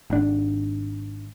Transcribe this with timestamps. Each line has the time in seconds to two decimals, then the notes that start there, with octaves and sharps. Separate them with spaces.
0.10 G#1 D4